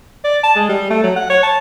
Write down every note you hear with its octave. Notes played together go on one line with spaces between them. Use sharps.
D5
A5
G#3
G3
A3
F#3
F#5
C#5
A5